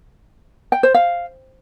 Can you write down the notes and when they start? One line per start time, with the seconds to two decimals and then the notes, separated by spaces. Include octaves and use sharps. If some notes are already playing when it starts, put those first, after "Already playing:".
0.72 G5
0.83 C5
0.94 F5